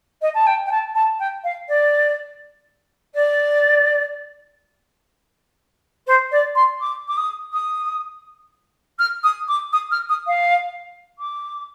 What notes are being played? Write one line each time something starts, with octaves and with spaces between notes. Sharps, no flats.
D#5
A5
G5
G5
A5
A5
G5
F5
D5
D5
C5
D5
C6
D6
D6
D#6
D#6
F6
D#6
D6
D#6
F6
D#6
F5
D6